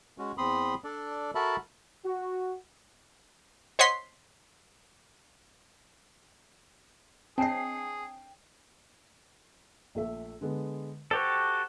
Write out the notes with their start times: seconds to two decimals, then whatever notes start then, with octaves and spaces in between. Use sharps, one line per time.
0.18 G#3 C#4 F#4
0.38 E2 C4 B5 C6 D#6
0.84 D4 A4 D5
1.35 F#4 A4 A#4 E5 A5 B5
2.05 F#4
3.79 C5 C#5 D#5 F#5 C6 B6
7.38 C4 D4 G#4 C#5 D#5 G5 A5 C7
9.95 A#1 A3 E5
10.41 D3 G#3 B3
11.11 F#4 G4 A4 C5